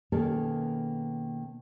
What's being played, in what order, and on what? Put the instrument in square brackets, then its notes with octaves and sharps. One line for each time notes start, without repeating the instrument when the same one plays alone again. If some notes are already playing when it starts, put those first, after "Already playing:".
[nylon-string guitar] B2 D#3 A#3 C#4 G#4 A4